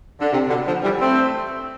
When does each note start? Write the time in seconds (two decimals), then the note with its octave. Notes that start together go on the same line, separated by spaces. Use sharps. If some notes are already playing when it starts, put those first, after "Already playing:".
0.20 D3
0.32 C3
0.49 B2 D3
0.66 D3 F3
0.83 E3 G3
1.01 A3 C4